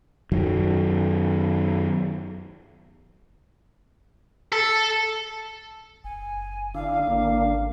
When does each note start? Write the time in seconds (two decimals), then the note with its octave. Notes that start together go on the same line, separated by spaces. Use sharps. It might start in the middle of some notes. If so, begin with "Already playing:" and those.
0.32 F#2 D#3 F#3
4.52 A4
6.04 F#1 G#5
6.75 D3 D4 E4 F5
7.07 G#1 D3 A#3 D4